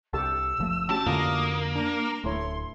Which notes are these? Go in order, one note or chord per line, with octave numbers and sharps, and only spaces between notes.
C2 G4 A4 A5 E6
F#1 F3 A3
G2 C#4 F#4 G4 A5
F2 D3 A3 A#3 F4 D#6
D4 A#5
D1 A3 E4 C#5 C6